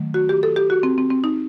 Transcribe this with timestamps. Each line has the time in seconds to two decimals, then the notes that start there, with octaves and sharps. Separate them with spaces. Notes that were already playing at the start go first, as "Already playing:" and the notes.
Already playing: D#3 F#3 A3
0.14 F#4
0.29 G4
0.43 A4
0.56 G4
0.70 F#4
0.83 C4
0.98 C4
1.11 C4
1.24 D#4